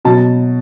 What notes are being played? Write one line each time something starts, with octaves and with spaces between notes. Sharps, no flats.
B2 F#3 A5